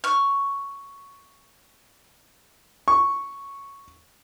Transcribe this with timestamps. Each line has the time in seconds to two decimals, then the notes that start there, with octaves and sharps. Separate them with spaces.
0.04 C#6 F6
2.88 C#6